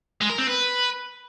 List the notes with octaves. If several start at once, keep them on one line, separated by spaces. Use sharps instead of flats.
G#3
A#4
C4
B4